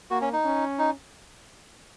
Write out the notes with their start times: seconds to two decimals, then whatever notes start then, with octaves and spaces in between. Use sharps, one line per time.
0.11 A#3 F#4
0.21 C#4
0.33 D#4
0.45 C#4
0.79 D#4